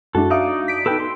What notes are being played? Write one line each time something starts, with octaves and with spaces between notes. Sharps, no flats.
F#2 G#3 D4 E4 F#4 A4
D#4 D5 E5 F5 D#6
B6 D7
B3 D#4 A4 B4 G5
C6